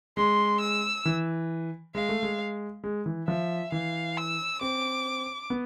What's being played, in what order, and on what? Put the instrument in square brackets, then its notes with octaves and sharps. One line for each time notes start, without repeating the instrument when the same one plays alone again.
[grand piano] G#3 [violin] C6
[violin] E6
[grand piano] E3
[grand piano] G#3 [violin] F5
[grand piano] A3
G#3
G#3
E3
[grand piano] F3 [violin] E5
[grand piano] E3 [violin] F5
[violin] E6
[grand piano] C4 [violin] D6
[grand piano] B3